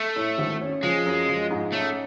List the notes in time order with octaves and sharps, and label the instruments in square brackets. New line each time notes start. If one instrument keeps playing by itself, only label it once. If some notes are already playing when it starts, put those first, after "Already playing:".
Already playing: [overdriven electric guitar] A3
[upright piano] A2
G#1
C#4
[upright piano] F3 [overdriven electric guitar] G#3
[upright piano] F#2
F3
G#2
[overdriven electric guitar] A3 [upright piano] C#4